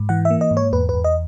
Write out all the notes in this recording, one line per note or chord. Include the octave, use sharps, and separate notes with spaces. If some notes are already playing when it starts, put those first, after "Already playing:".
Already playing: G#2
E3 F#5
E5
A#3
D#5
G#2
C#5
E2 B4
E2 B4
D#5